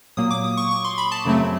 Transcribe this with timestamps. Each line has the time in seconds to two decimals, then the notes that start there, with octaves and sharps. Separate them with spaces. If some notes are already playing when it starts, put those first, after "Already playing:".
0.17 A#2 F#3 A#3 D#6
0.30 D6
0.44 D#6
0.57 C#6
0.71 C#6
0.84 C6
0.98 B5
1.12 A5
1.25 F#2 C#3 F#3 A3 C4